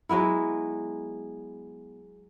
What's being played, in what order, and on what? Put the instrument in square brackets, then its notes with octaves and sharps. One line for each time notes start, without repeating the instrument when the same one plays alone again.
[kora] F#3 G#3 B3 E4